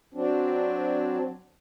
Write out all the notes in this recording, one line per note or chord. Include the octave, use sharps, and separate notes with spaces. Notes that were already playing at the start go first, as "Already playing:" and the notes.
F#3 C4 D4